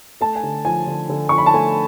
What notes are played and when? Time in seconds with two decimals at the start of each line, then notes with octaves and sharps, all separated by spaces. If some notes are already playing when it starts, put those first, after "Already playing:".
0.21 A3 A5
0.36 G#5
0.43 D3
0.65 F3 G#5
0.87 D3
1.09 D3
1.29 F3 C#6
1.38 B5
1.46 A5
1.54 A3 G#5